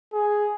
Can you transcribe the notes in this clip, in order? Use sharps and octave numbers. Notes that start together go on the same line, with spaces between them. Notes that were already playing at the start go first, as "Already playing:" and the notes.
G#4